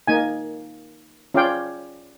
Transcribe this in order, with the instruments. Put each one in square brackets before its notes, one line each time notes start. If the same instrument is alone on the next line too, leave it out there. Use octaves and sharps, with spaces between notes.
[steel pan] A#3 D#4 G#5
C#4 F4 D5 F5 G5